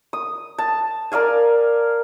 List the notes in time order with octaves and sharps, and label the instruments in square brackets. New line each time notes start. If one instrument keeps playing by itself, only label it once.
[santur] D#6
A5
A#4 D5 F5 G#5